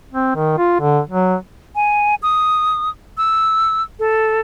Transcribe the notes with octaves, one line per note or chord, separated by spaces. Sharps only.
C4
D#3
F4
D3
F#3
G#5
D#6
E6
A4